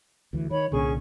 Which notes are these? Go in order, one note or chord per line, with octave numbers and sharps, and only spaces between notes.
D2 E3
D#3 C#5 B5
C2 A#2 D3 C#4 G#4 C#6